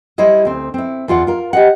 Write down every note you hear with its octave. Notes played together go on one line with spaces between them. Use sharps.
G3 E4 C5 C#5 D#5
D2 C4
C4 E4
E2 F4 D5 F#5
F4 A#4
G4 D#5 F#5